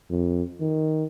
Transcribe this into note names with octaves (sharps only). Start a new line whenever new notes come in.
F2
D#3